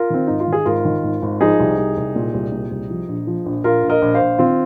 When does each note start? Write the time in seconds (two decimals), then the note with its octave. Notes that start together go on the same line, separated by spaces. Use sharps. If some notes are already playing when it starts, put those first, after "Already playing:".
Already playing: F4 A#4
0.10 D#3 C4
0.27 G#1 D#4
0.40 F4
0.48 D#3 G#4
0.66 G#1 F4 A#4
0.85 D#3
1.03 G#1
1.22 G#1
1.41 F3 D#4 G#4
1.60 C2
1.78 C2
1.97 C2
2.16 A#2
2.34 C2
2.52 A#2
2.71 C2
2.90 F3
3.08 A#1
3.27 F3
3.46 A#1
3.64 A#1 F4 A#4
3.83 A#1
3.89 A#4 D#5
4.02 A#1
4.14 C5 F5
4.20 A#1
4.39 D#3 C4 F4